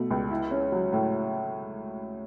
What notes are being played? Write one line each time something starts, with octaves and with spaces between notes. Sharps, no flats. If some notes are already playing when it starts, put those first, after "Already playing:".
Already playing: B2 A3
C#2
E4
C#4
F#3
A2